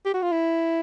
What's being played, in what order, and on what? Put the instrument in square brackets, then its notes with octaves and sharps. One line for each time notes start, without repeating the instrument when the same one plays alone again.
[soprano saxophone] G4
F#4
F4
E4